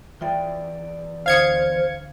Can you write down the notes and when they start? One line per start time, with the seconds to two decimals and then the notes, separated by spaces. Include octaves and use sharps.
0.21 E2 E3 F4 D5 E5 G5
1.26 D2 D3 C5 F5 D#6 G#6 C#7